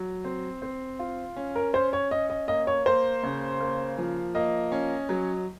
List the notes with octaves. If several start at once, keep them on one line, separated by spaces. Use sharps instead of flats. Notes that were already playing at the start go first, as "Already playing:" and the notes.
Already playing: F#3
C4
C4
F4
C#4
A#4
C#4 C5
C#5
C#4 D#5
D#5
A#3 D#5
C#5
A#3 C5
C#3
A#3
F3
A#3 D#5
C#4
F#3